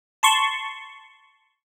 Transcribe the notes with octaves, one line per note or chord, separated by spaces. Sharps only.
A5 C6 C#6